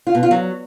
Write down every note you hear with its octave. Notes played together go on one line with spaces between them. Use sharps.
F4
B2
F4
F#3